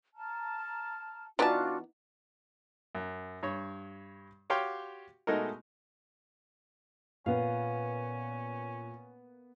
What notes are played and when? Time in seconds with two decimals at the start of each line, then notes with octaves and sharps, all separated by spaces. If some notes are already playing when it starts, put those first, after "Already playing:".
0.16 A5 A#5 F6
1.39 E3 B3 D4 D#4 F4 F#4 D5 A5
2.95 F#2
3.43 G2 C#5
4.50 F#4 G4 C#5 F5 G5 C6
5.27 B2 G#3 A3 D#4 F#4 A#4
7.26 A#2 A#3 B3 C#4 F5